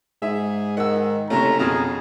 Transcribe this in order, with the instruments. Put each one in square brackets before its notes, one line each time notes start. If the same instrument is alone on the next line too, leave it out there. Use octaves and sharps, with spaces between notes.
[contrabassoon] G#2 [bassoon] G#4 [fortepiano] E5
[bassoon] D#3 [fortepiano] F#5 E6
[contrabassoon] F#1 [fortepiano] C3 A3 [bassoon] C#4 [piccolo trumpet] A#5
[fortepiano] F2 B2 F6 [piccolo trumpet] G#4